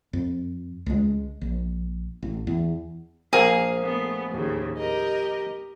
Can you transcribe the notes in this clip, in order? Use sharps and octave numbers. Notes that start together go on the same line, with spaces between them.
F2
C#2 G#3
A#1
A1
E2
A#1 A#3 G#4 F5
A3 B3
D#2 A2 C#3
G4 A#4 D#5